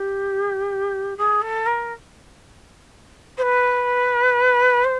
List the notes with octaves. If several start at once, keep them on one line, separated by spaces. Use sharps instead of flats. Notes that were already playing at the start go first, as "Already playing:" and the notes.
Already playing: G4
G#4
A4
A#4
C5
B4
C5